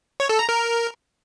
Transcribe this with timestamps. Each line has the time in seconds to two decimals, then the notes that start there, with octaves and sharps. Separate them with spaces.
0.20 C#5
0.29 A4
0.39 A#5
0.49 A#4